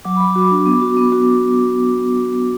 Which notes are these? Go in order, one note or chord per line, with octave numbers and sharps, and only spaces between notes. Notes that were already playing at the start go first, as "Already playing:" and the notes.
F#3 D6
F#3 B5
D6
F#4
D4
B3
F#4
B3
F#4